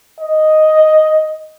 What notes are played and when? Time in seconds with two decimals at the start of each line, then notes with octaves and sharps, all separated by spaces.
0.21 D#5